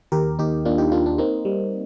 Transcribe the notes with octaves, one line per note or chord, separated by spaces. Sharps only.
D#2 G4 A#4
D#2 D#4 G4
A#3 D4 F4
D#4 G4
A#3 D4 F4
D4
A#3 C4 D#4
G3